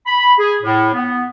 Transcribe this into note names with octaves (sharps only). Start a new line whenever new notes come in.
B5
G#4
A2
B3